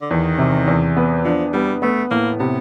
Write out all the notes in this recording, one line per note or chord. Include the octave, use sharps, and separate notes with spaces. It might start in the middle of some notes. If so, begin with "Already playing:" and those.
D3
E2 D#3
C3
E2
B3
F3 D4
G3 B3
A3 B3
A2 A#3
C3 B3